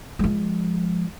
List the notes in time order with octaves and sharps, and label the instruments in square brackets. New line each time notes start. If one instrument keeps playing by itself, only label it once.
[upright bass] F3 G#3